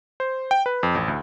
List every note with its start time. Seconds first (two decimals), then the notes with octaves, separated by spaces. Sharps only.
0.20 C5
0.51 G5
0.66 B4
0.83 F2
0.95 A1
1.08 D2